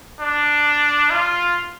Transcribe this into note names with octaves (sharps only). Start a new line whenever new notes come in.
D4
F4